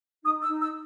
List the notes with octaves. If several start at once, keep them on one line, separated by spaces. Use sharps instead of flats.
D#4 D#6
E6
D#4
E6